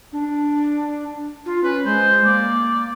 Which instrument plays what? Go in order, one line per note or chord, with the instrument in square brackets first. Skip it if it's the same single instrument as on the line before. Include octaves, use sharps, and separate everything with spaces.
[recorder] D4
F4
[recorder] C#4 [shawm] B4
[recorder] G#3 [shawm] C5
[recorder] A#3 [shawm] D5